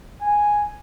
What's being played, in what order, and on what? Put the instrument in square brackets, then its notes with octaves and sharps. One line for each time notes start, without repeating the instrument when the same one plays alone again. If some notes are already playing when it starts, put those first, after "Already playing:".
[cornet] G#5